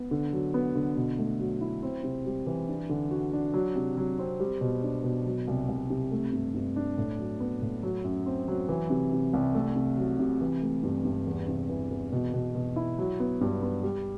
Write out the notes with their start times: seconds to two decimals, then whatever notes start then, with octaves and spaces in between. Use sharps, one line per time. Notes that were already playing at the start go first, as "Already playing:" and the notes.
Already playing: B3
0.11 D3
0.33 F#3
0.54 B3
0.76 D3
0.96 B2
1.18 A3
1.39 F#3
1.61 E4
1.83 C4
2.04 C3
2.26 G3
2.47 E3
2.68 D4
2.90 D3
3.11 F#4
3.33 D4
3.54 F#3
3.75 C3
3.97 F#3
4.19 C4
4.40 G3
4.61 B2
4.83 D4
5.04 B2
5.26 F#3
5.48 C2
5.69 C2
5.90 C3
6.11 A3
6.33 G2
6.54 G2
6.76 D4
6.98 A2
7.19 F#3
7.40 B3
7.62 A2
7.83 F#3
8.04 F#2
8.26 C4
8.48 F#3
8.69 E3
8.90 C3
9.12 C3
9.34 C2
9.54 A3
9.76 C3
9.97 F#3
10.19 C3
10.41 E3
10.62 A3
10.83 G2
11.05 G2
11.27 E2
11.48 C3
11.69 E3
11.91 E2
12.12 B2
12.34 B2
12.55 B2
12.76 E4
12.99 F#3
13.20 B3
13.41 G2
13.63 B3
13.83 G3